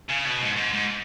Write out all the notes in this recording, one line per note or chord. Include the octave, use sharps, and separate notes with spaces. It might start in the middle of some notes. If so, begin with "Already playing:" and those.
C#3
B2
G#2
G#2
G#2